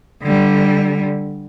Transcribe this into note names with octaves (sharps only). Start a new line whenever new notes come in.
D3 G3